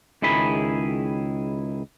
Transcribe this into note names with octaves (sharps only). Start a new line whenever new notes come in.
C#2 D#3 E4 G#4 B5